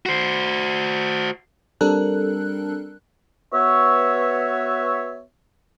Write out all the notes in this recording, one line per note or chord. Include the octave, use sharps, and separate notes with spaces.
F#4 C5
G3 C4 D4 A4 A#4 F#6
B3 F#4 C#5 E5